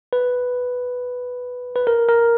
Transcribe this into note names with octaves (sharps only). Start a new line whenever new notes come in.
B4
B4
A#4
A#4